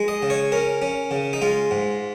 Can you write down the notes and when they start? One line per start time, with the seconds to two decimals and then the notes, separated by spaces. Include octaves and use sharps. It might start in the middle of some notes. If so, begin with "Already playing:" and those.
Already playing: G#3
0.08 D#5
0.22 C#3
0.30 C#5
0.52 C#4 A#4
0.82 C#4
1.11 C#3
1.33 D#4
1.42 G#3 F4
1.71 G#2